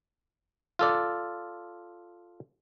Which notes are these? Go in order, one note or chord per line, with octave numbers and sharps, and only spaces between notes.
F4 A4 D5